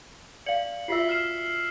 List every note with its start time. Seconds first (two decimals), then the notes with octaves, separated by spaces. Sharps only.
0.46 D5 F5 C#7 F#7
0.88 F4 F#4 E5 E6 B6 C7
1.09 F6 C7 E7